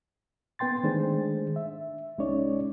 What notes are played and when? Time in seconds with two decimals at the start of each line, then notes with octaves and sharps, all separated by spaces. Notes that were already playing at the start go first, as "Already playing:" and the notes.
0.59 B3 B4 G5 C6 A6
0.83 D#3 G#3 A3 D4 G#4 C5
1.56 E5
2.18 C2 G#3 C#4 D#4 C#5 D5